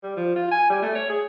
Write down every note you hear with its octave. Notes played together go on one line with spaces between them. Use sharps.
G3
F3
F4
G#5
G3
A3
C#5
G#4